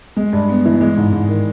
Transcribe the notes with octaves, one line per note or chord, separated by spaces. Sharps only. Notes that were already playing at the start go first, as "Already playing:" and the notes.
G#3
G2
B3
E3
G#3
G#2
G#2
D#3